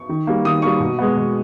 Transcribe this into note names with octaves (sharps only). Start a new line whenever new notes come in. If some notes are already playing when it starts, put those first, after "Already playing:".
Already playing: C#6
D#3
G3 A#3
D#3 D#6
G3 A#3 C#6
B2
G#3 B3
B2